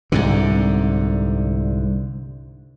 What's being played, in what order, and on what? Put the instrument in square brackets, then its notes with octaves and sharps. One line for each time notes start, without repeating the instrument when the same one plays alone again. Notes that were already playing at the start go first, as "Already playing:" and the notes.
[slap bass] C2 G#2 D3